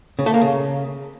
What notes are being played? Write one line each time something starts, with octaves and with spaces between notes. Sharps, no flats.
C#3
A3
A#3
C#3